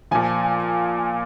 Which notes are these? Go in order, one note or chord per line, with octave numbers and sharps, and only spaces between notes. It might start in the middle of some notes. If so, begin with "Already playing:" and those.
A#2 F3 G#5